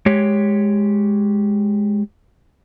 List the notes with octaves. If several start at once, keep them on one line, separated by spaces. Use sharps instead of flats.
G#3 G4 C#5